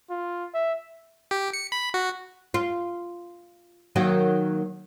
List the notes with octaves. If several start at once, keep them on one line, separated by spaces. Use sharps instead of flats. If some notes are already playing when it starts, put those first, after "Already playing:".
F4
E5
G4
C#7
B5
F#4
F4
D#3 F#3 A#3